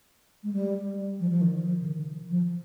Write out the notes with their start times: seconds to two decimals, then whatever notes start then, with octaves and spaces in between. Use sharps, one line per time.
0.43 G#3
0.53 G3
1.20 F3
1.31 F3
1.41 D#3
1.64 F3
1.81 C#3
1.86 D#3
2.30 F3